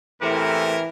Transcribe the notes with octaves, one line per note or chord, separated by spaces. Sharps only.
E2 A2 C3 E3 A#4